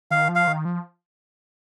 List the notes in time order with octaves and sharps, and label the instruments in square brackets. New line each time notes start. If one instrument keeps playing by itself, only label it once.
[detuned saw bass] D#3 [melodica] F5
[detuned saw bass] F3
[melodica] F5
[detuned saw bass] D#3
F3